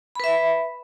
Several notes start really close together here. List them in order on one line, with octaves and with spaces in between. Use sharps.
B5 B4 E5